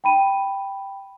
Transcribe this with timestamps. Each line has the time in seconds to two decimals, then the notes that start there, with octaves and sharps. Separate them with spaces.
0.04 G5 B5 D#7